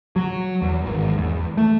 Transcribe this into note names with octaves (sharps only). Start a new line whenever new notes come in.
F#3
E2
G#1
E2
A3